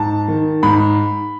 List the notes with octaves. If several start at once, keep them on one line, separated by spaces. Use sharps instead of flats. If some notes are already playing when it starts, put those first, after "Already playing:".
Already playing: G#2 A5
D#3
G#2 B5